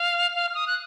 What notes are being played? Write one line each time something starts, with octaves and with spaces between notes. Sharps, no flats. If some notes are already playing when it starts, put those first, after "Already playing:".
Already playing: F5
F5
F6
D#6
F#6